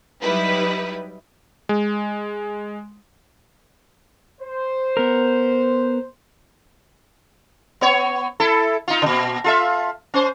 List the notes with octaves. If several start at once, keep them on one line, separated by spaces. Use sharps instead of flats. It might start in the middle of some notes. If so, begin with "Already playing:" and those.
F#3 G3 D#4 E4 B4
G#3
C5
B3 A#4
B3 C#5
E4 A4
D#4 F4
A#2 C#3
F4 A4 E5
C#4 C5